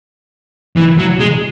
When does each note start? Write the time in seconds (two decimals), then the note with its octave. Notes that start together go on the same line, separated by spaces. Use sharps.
0.76 E3
0.98 F#3
1.19 G#3